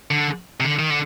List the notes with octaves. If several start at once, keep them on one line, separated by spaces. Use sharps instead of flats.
D3
C3
D3
D#3
D3